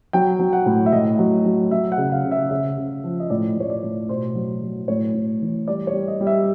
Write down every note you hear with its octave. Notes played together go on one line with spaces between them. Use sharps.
F#3 G5
F#3
F#5
A2
E5
A2 D#5
F#3
F#3
F#3 E5
F#5
C#3
F5
C#3
E5
C#3 E5
C#3
F3
D#5
A2 D5
A2 C#5
D5
A2
B2 C5
F#3
F#3
A2 C#5
A2
E3
G3 D5
C#5
G3
D#5
G3
E5